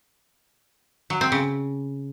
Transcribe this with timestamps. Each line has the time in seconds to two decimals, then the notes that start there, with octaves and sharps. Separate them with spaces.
1.10 F#3
1.21 C4
1.32 C#3